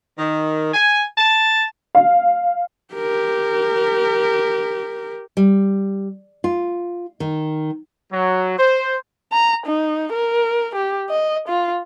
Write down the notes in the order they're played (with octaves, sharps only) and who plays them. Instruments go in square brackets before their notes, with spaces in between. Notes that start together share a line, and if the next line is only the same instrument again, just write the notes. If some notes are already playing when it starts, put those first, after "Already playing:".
[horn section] D#3
G#5
A5
[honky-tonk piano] F5
[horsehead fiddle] G4 A#4
[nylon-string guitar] G3
F4
D#3
[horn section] F#3
C5
[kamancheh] A#5
D#4
A#4
G4
D#5
F4